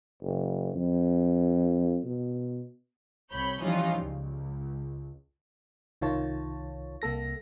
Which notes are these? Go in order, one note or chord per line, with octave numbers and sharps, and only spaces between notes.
F#1
F2
B2
C2 C#5 B5 G6
E3 F3 G3 C#4 D#4 F4
C#2
C2 D#3 F4 C#5 A5
C2 A#3 A4 A#6